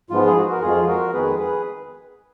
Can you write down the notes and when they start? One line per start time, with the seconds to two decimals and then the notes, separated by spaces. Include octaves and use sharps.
0.10 G#2 F3 G#3 B3 F4
0.27 G#4
0.37 F#4
0.52 A#4
0.62 F2 F3 G#3 F4 G#4
0.87 F#4 A#4
1.13 F2 D#3 G#3 B3 G#4 B4
1.39 G#4 B4